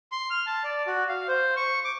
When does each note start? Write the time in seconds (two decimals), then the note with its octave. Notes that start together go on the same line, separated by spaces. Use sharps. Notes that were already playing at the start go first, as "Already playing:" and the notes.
0.12 C6
0.30 F6
0.46 A5
0.64 D5
0.87 F#4
1.09 F5
1.28 C5
1.56 C#6
1.85 D6